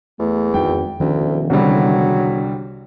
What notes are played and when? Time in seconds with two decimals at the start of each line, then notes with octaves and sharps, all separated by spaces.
0.19 E2 A3
0.54 G#1 F2 G#3 C4 G5
1.00 E1 D2 D#3 F3 C#4
1.50 C2 D3 F#3 G3